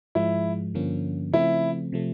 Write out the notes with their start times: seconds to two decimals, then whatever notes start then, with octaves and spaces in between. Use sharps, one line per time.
0.15 G#2 F3 G#3 E4
0.74 G2 D3 F3 A#3 C#4
1.32 C#3 F3 A3 C4 E4
1.92 C3 F3 A3